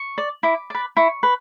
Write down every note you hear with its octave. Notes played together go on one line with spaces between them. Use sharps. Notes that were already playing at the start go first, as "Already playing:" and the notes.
Already playing: C#6
D5
E4 D6
B4 D5
E4 C#6
B4